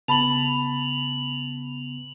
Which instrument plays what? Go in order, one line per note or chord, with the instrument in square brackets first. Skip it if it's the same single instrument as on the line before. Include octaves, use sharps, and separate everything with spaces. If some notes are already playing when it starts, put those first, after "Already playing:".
[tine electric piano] C#3 B3 [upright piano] A5 B5 [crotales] F7 F#7